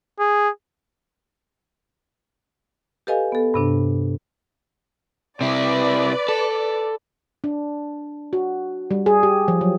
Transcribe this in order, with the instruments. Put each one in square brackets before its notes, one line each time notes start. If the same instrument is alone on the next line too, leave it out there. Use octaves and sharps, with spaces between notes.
[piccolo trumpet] G#4
[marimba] G4 A4 B4 D#5 F5 G#5
B3 A4
G2 C3 D4
[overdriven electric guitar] C3 E4 [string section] B4 D5
[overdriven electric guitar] A4
[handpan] D4
F#4
G3
G#4
G4
F3
F#3